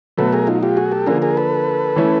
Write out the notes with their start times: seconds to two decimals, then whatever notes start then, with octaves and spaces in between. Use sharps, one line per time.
0.17 B2 F#3 A3 A4 B4
0.33 G#4 A#4
0.47 D#4 F4
0.63 F4 G4
0.77 F#4 G#4
0.92 G4 A4
1.06 D3 F3 A#3 G#4 A#4
1.22 G#4 A#4
1.37 A4 B4
1.96 E3 A3 C#4 E4